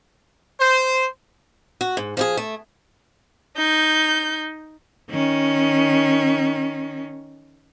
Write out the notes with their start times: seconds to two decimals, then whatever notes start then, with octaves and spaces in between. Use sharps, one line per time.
0.61 C5
1.81 F#4
1.97 G#2
2.17 F3 G4 G#4
2.37 A3
3.57 D#4 G6
5.10 D#3 C#4